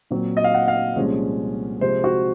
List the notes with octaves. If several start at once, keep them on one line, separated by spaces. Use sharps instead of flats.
A#2 F#3 C4
D#5
F5
F#5
F5
C2 A#2 F3 G#3 C#4
C3 F3 G#3 C4 C5
F#4